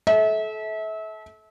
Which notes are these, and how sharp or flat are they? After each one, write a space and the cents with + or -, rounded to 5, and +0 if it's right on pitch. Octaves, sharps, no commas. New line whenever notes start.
A4 -30 E5 -30